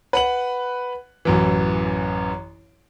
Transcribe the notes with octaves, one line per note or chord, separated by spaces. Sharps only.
B4 F#5 F#7
A1 F#2 E3